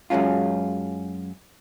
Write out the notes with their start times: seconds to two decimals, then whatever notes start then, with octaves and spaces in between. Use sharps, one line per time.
0.10 F#2 F#3 G#3 C#4 F4